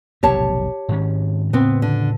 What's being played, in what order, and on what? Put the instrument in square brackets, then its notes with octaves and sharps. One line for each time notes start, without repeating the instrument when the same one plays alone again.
[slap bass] F1 B1 A2 [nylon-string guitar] G4 C#5 A5
[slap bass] G#2 D#3 C#4
[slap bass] A2 C#3 [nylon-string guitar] B3 C4
[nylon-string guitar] D3